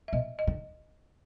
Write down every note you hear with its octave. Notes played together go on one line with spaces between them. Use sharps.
E5
B2 D#5
D#5
D3